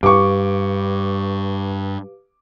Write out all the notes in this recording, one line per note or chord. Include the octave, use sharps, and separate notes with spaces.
G2 G4 B4 F5 C#6 D6